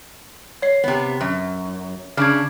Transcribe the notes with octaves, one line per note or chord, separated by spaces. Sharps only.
C#5 C7
C3 B3
F#2
C#3 D4 F6 G#6